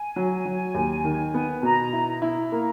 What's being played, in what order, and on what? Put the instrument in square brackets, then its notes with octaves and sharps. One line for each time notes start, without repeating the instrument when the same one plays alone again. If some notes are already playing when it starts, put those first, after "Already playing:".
Already playing: [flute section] G#5
[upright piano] F#3
F#3
D#2
D#3
B3
[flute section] G#5
[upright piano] B2 [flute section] A#5
[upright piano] E4
E4
[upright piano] A#3 [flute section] A#5